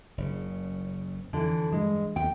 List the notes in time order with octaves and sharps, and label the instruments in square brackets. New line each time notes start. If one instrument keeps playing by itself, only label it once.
[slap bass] F#1 C#3
[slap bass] F2 [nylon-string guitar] D3 E3
[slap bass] G2 [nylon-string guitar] G#3
[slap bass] D#2 D3 [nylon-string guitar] G5